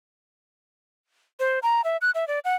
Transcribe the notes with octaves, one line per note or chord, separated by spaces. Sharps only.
C5
A#5
E5
F#6
E5
D5
F#5